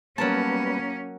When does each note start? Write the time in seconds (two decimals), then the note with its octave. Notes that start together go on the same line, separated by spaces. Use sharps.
0.18 F#3 G3 A#3 B3 C#4 A#4 B4 A5